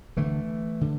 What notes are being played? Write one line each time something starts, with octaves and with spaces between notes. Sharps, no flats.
D2 D3 E3 A3
D3